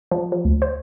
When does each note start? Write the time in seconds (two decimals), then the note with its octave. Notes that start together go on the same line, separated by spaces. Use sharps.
0.11 F3
0.32 F3
0.45 D2
0.62 C5